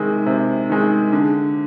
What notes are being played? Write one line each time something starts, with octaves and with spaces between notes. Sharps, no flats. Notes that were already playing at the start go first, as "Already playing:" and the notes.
Already playing: C3 D#3 G#3
C3
D#3 G#3
D3